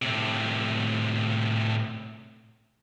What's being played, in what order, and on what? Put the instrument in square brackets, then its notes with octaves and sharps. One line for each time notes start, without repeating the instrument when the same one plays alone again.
[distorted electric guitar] A2 C3